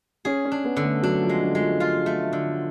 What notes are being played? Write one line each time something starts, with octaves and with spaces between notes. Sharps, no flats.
C#4 G#4
C#4
D4
B3
D3
A3
F#3 D4
F3
G#3
D3
G#3
F3
F4
A3
D3